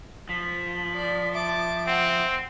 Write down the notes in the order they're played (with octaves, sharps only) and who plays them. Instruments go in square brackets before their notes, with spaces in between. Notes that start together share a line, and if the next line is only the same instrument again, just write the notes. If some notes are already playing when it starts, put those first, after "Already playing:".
[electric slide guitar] F3 [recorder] B6
[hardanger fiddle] D5
[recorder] E5 [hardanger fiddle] A5 D6
[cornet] C4 [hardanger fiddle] F#5